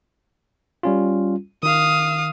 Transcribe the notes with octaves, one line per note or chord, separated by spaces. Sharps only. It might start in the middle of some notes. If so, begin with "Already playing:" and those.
G3 C#4 F4
D#3 F5 D#6